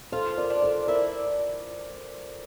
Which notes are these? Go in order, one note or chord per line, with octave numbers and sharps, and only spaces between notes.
F4 A4 C5
A#4 D5
D4
A4 C5
E4 A#4 D5